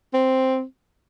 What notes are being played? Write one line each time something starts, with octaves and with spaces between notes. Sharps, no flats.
C4